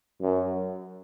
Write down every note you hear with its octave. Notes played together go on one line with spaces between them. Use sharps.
F#2